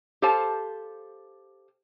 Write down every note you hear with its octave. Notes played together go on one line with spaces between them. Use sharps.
G4 A4 C5 F5 A5